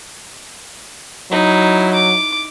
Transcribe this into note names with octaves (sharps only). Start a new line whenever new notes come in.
F#3 D#4 E4
D6